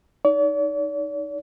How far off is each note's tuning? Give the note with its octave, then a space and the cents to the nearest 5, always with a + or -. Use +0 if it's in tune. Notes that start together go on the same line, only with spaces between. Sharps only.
D#4 +0 D5 -45